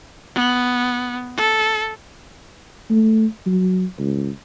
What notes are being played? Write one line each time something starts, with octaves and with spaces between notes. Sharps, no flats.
B3
A4
A3
F#3
C#2